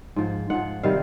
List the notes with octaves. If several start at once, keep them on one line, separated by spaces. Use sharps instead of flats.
G#2 F3
G#2 F3 F#5
C3 D#3 G3 F5